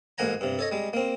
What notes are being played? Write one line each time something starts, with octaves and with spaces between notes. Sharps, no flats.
A1 G#2 A#3 F#5 G#5 A#5
G2 C3
A4 C#5 D#5
G3 G#3
A#3 C4